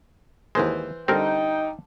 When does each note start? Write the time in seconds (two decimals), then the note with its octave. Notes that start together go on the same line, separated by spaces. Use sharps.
0.55 D#2 E3 G#3 C5
1.08 D3 G3 C4 D#4 A#4 G5